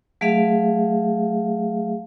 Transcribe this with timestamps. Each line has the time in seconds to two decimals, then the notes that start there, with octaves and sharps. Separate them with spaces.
0.21 F#3 A3 G#4 E5 F5